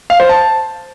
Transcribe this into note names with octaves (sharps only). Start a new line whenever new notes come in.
F5
C5
A5